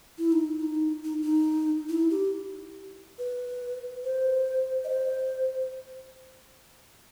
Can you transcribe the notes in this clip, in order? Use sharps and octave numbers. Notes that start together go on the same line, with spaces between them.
E4
D#4
D#4
D#4
D#4
E4
G4
B4
C5
D#5
C5